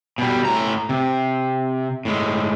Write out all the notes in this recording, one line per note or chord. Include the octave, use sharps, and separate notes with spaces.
B2 G3
A2 A#5
C3
A2 G#3